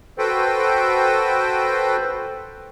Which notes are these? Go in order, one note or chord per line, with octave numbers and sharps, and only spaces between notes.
F#4 A4 B4 C5 G5